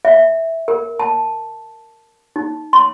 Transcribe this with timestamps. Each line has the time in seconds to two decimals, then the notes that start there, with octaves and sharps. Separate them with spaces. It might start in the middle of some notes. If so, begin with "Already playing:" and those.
0.05 E5
0.68 A#4
1.00 A5
2.36 D#4
2.73 C6